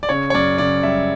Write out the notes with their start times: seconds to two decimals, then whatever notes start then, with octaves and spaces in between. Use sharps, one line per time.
0.03 D5
0.09 C#3 C#5
0.30 C#5
0.35 F#2 D5
0.58 C#3 D5
0.83 G3 E5